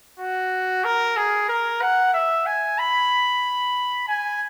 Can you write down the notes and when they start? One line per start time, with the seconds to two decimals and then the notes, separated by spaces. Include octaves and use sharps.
0.19 F#4
0.84 A#4
1.17 G#4
1.49 A#4
1.82 F#5
2.14 E5
2.46 G#5
2.78 B5
4.08 G#5